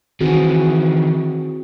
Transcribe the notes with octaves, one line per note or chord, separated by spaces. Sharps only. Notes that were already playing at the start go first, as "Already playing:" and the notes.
D#3 E3 C4 F#4 G#4